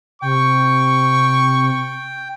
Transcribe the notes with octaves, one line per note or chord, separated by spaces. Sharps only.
C3 G5 C#6